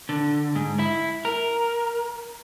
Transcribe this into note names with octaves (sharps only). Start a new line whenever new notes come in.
D3
G#2
E4
A#4